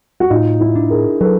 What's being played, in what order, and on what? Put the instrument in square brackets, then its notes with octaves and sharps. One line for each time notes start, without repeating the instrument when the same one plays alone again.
[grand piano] F#4
[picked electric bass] A2 [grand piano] D#4 F4
[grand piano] E4
[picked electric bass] D4
[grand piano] G#4 A#4
[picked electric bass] F#3 [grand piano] A4 B4